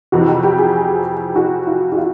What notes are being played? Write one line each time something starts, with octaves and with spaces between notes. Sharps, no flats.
F2 C3 E3 F#4
G4
G4
G#4
F#4
F4
F#4
F4